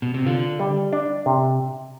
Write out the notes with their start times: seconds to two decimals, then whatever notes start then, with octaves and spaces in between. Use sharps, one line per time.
0.02 B2
0.14 C3
0.26 D3 F4
0.60 G3
0.93 D4
1.26 C3